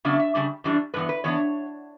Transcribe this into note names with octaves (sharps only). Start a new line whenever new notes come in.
C#3 F#3 B3 D4 E5
E5
C#3 G3 D4
F#2 E3 G3 D4
G2 E3 B3 B4
B4
E3 B3 D4 C#5